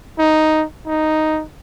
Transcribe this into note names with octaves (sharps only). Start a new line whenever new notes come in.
D#4
D#4